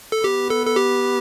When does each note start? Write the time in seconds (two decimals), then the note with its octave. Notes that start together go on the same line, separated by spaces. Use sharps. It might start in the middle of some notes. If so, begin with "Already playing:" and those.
0.12 A4
0.24 B3 G4
0.50 A4
0.66 A4
0.76 G4